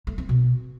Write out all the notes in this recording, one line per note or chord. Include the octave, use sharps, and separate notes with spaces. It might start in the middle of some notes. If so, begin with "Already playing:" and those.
A3
C4
B2